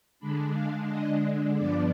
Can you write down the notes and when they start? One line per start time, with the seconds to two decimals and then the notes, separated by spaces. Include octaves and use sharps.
0.20 D3 G#3 D4 B5
0.54 F5
0.88 D#5
1.55 G2 F3 B3 D4 D5